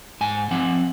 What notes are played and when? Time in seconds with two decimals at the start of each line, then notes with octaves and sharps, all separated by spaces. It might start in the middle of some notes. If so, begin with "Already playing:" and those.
0.21 G#2 G#5
0.51 F3 C4 F#5